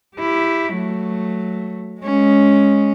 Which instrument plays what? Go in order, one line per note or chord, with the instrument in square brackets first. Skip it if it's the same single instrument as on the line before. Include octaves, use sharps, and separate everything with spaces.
[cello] E4 G4
F#3 A3
G#3 C#4